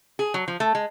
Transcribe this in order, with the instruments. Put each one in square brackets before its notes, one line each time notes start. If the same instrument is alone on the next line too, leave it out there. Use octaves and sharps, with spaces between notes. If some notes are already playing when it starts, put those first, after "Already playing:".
[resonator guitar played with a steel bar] G#4
F#3
F3
A3
G#3